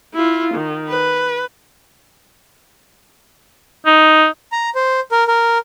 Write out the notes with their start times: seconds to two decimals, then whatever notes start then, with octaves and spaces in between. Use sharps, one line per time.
0.15 E4 F4
0.54 D#3
0.89 B4
3.86 D#4
4.52 A#5
4.75 C5
5.12 A#4
5.28 A#4